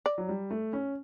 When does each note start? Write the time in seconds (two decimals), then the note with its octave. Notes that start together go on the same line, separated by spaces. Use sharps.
0.06 D5
0.18 F#3
0.29 G3
0.51 A3
0.73 C#4